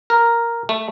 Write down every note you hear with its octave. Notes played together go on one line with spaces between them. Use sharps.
A#4
A3